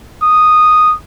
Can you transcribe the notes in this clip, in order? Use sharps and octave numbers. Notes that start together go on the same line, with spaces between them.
D#6